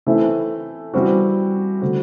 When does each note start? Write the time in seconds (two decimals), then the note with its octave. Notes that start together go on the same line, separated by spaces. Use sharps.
0.07 E3 A3 C4 E4 A4
0.94 E3 G3 C4 F#4
1.81 D3 A3 C4 F#4